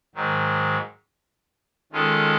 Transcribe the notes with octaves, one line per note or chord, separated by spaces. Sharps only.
G#2 D#3 F#3
D#3 G#3 C#4 F4 A4